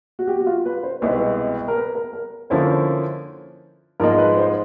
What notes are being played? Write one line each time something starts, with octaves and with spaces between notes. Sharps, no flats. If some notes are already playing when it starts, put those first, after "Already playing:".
F#4
G4
F#4
F4
B4
C5
C2 B2 G#3 B3 E4
A#4
B4
A#4
A#4
D3 F3 A#3 C#4 E4 C5
G#2 F3 G#3 A#4
B4
C5